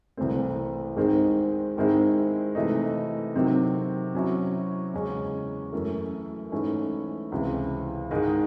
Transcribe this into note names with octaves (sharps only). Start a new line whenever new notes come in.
C2 C3 E3 A3 C4
G#2 D#3 G#3 C4
G#2 D#3 G#3 C4 E4
C3 E3 A3 D#4
C3 D#3 F#3 C4
C3 F#3 C#4 E4
E2 C#3 G#3 C#4
F#2 E3 A3
G#2 E3 A3 C#4 E4
C#2 C3 E3
G#2 D#3 G#3 D#4